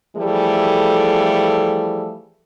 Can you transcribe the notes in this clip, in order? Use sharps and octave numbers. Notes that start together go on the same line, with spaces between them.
E3 F3 G3 A3 G#4 A4